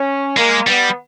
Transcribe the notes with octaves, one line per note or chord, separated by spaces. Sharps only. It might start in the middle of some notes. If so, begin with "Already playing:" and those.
Already playing: C#4
G#3 A#3
G3 B3